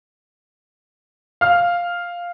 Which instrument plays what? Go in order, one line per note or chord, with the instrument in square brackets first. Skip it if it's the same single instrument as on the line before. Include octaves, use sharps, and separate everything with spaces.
[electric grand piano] F5 F6